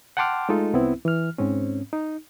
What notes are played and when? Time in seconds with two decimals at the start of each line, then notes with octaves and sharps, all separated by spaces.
0.17 F#5 G5 A5 C6 D6 F6
0.49 G#3 A3 D#4 F4 A4
0.74 C2 B3 C4 E4
1.05 E3 F6
1.38 G#2 C4 C#4
1.93 D#4